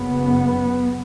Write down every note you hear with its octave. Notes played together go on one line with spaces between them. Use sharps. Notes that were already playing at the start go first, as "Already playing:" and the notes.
Already playing: F#1 F#2 C#3 B3